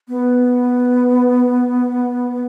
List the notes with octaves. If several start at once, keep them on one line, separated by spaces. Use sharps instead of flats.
B3